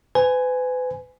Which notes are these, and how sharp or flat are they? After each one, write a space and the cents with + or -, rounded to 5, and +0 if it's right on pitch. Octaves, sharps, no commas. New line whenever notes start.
B4 +35 G#5 +0